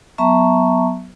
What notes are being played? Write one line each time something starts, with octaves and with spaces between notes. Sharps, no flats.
F#3 B3 E5 A5 A#5 C#6